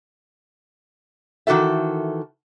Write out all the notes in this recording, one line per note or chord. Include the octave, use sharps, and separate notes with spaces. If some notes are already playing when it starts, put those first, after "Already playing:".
D#3 E3 F#4 A4 E5